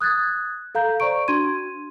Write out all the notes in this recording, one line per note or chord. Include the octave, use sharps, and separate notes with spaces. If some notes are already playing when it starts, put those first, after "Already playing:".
D#6 F#6 G#6 A6
A4 F5 A#5 G6
C5 D5 A#5 C#6 D7
D4 F#4 C6 G#6 D#7